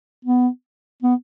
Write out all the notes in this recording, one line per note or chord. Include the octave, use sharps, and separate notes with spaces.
B3
B3